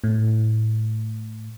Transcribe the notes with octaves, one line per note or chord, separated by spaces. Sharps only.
A2